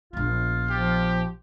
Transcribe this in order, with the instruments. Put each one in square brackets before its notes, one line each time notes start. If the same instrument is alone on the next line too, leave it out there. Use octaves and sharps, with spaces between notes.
[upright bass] A#1 B3 [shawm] F4
[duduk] F3 [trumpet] G4